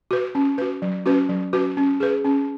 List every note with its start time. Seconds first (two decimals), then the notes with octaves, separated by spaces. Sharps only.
0.11 F#4 B4
0.35 C#4
0.58 F#4 B4
0.82 F#3
1.06 C#4 F#4 B4
1.29 F#3
1.53 C#4 F#4 B4
1.77 C#4
2.00 G#4 B4
2.24 C#4